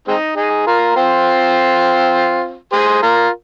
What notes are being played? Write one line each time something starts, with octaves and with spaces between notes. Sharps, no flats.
G#3 C4 D#4
D#4 G#4
F4 A#4
C4 F4
G#4 C5
F4 A#4